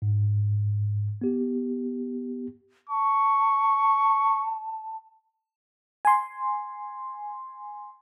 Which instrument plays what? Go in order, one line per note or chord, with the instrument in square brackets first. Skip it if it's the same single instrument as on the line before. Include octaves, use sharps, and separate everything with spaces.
[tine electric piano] G#2
B3 G4
[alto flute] A5 [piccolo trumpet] C#6
[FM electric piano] G#5 C6